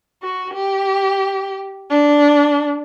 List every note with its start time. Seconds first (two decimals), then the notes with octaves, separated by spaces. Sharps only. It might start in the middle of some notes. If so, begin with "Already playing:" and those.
0.23 F#4
0.53 G4
1.91 D4